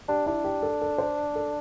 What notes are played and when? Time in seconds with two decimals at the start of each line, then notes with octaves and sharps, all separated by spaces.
0.08 D4 G4
0.26 D4 E4
0.44 G4
0.63 A4
0.82 A4
0.98 C5
1.36 A4